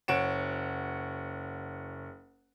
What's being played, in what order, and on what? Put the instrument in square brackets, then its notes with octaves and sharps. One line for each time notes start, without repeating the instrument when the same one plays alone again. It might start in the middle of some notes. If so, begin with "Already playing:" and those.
[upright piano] F#1 C#5 F#5 D7 E7